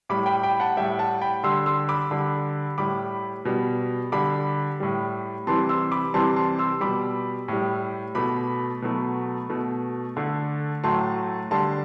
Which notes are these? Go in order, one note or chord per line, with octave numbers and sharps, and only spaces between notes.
A2 G3 B5 D6
G5 B5
G5 B5
F#5 A5
A2 G3 E5 G5
F#5 A5
G5 B5
D3 G3 C6 E6
C6 E6
B5 D6
D3 G3
A2 G3 B5 D6
B2 G3
D3 G3 B5 D6
A2 G3
C3 E3 G3 A5 C6
C6 E6
B5 D6
C3 E3 G3 A5 C6
A5 C6
C6 E6
B2 G3 B5 D6
A2 G3
B2 A3 B5 D6
B2 F#3 A3
B2 A3
D3 A3
A2 F#3 A3 A5 C6
D3 G3 A5 C6